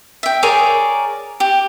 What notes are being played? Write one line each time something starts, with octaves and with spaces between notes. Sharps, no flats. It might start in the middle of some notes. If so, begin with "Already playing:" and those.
E5 G5
G#4 A#4 C#5 D5
G4